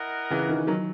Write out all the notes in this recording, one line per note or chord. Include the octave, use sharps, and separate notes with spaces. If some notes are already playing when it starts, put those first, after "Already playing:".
Already playing: E4 A#4 D#5 F#5
C#3 E3
D#3
D#3 F#3